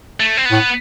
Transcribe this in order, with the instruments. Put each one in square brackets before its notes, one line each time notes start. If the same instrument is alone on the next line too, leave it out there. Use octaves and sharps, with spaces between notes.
[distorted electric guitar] A3
C4
B3
[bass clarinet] A2